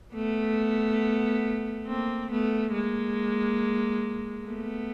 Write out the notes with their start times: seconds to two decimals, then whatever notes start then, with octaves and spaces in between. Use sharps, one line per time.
0.14 A3 B3
1.87 A#3 C4
2.31 A3 B3
2.73 G#3 A#3
4.46 A3 B3